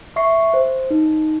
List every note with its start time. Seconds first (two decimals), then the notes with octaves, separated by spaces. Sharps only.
0.16 E5 C#6 C7
0.54 C5
0.90 D#4